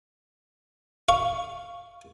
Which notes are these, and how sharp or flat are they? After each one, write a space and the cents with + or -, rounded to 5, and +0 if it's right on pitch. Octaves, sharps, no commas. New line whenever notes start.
F5 +0 C#6 +0